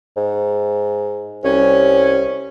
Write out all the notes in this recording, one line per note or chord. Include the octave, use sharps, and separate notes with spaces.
G#2
C2 G3 C#4